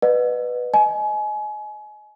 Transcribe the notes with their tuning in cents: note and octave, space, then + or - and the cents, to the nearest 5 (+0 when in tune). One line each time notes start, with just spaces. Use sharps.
B4 +0 D#5 -40 F#5 -30
D#5 +0 G#5 +30